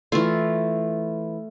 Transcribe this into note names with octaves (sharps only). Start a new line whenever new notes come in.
E3 A3 F4